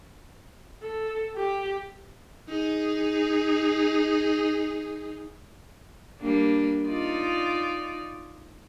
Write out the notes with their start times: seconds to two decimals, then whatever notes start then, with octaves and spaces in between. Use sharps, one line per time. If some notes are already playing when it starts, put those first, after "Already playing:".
0.82 A4
1.36 G4
2.49 D#4 G#4
6.20 G3 A#3 D4
6.88 D#4 F4 D5